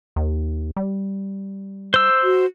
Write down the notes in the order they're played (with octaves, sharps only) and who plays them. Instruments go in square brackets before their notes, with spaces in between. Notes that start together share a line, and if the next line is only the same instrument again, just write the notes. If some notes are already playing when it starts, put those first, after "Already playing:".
[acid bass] D#2
G3
[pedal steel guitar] C5 E6
[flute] F#4